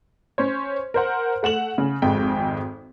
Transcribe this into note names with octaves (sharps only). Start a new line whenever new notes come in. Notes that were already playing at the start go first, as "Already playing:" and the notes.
C#4 C5 C#5
A#4 C5 F#5
A3 F#5 E7 F#7
C#3
G#1 F2 G#3 G5